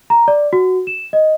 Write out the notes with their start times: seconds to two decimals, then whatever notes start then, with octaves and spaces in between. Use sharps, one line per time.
0.10 A#5
0.28 D5
0.53 F#4
0.87 E7
1.13 D#5